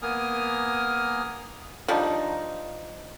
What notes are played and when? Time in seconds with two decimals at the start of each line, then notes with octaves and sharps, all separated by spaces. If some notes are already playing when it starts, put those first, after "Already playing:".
0.02 A#3 B3 A#4 G#5 D#6 F6
1.88 F3 G3 D4 D#4